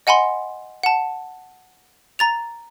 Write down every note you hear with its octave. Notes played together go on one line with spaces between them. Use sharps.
D#5 F#5 G#5 B5 C6
F#5 A5
A#5 A6 F7